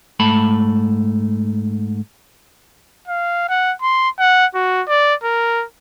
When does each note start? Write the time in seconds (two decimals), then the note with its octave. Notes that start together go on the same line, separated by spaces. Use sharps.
0.20 G#2 A3 A5 B5
3.08 F5
3.49 F#5
3.82 C6
4.19 F#5
4.55 F#4
4.88 D5
5.24 A#4